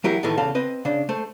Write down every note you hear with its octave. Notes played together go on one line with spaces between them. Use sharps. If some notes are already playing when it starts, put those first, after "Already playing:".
E3 F#3 E4 G4 A#4
A2 D#3 E3 A3
E2 C#3 A4 F5 A5
C4 B4 D#5
C#3 D4
A3 C5